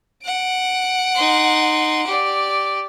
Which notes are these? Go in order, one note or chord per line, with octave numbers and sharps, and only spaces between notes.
F#5 D7
D#4 C6
G4 D5